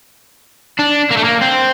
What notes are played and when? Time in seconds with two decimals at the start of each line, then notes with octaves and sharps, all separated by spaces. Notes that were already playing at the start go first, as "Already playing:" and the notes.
0.79 D4
1.10 A#3
1.17 A3
1.24 A#3
1.41 C4